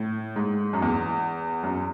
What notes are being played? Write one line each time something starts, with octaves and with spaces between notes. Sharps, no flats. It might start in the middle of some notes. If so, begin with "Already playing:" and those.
Already playing: A2
G#2
F#2
E2
F#2